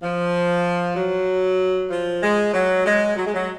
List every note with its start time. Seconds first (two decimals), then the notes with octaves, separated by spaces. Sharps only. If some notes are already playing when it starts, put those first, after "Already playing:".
0.02 F3
0.96 F#3
1.90 F3
2.22 G#3
2.53 F#3
2.85 G#3
3.16 F#3
3.25 G#3
3.34 F#3